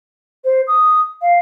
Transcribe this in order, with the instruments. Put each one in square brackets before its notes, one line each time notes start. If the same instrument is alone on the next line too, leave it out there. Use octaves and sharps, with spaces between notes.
[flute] C5
D#6
F5